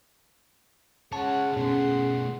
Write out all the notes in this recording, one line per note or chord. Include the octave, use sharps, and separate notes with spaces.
G#3 C#4 G#4 C#5 F#5 A5
B2 A3 C#4 F#5 C6